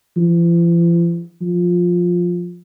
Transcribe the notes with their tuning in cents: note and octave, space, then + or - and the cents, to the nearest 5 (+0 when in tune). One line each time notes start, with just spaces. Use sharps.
F3 -45
F3 +10